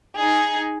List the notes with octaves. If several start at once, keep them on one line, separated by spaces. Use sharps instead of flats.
D#4 G#4